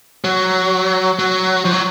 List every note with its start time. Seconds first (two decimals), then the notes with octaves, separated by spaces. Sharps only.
0.24 F#3
1.19 F#3
1.65 F3
1.73 F#3